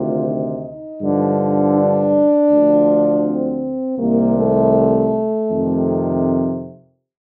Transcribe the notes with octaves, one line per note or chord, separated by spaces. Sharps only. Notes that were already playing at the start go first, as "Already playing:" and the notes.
Already playing: D2 C3 D#3 F4
D#4
G2 D3 F3
D4
D2 D3 F3
C4
C2 C3 D#3 A#3
A3
F2 C3 D#3